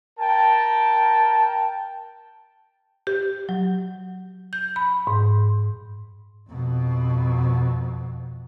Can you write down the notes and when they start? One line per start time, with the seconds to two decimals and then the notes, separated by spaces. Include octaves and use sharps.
0.20 A#4 G5 A5
3.07 G4
3.49 F#3
4.53 G6
4.76 B5
5.07 G#2
6.50 F2 B2